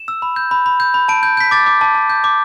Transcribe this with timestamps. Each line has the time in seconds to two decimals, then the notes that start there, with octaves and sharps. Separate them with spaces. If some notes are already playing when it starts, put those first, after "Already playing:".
Already playing: E7
0.08 E6
0.22 B5
0.36 G6
0.51 B5
0.66 B5
0.80 G6
0.94 B5
1.08 A5 D7
1.23 G6
1.37 G6 B6
1.51 D6 A6
1.66 D6
1.81 A5
1.95 A5
2.10 G6
2.24 D6